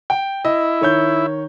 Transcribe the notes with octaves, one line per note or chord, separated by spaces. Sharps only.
G5
E4 D#5
D#3 C#5 G6